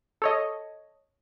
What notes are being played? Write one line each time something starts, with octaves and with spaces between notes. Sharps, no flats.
A4 C#5 D#5